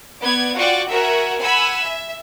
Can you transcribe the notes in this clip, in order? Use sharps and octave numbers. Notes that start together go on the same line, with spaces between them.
B3 D5 G#6
F4 F#4 D5 F#5 G5 C#6
F#4 A#4 E5 F#5 G#5
F#5 G#5 B5 E6
E5